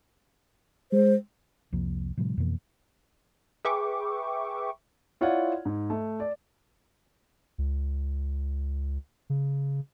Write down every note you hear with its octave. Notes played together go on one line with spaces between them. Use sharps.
G#3 C5
C2 F2 F3 A#3
A2 C3 F3 G3
F2 B2 E3 A#3
G#4 B4 E5 G5 C#6 D6
E4 F4 C#5 D5 F#5
G#2
A3
D5
C#2
C#3